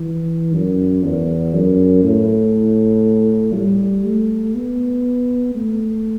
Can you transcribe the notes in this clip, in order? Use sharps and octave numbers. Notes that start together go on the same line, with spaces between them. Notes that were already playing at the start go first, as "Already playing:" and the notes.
Already playing: E3
F#2
E2
F#2
A2
G3
A3
B3
A3